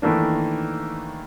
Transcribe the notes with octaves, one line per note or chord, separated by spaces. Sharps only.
D#3 E3 A3 A#3 D4